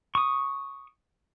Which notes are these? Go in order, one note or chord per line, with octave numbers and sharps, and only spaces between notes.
C#6 D#6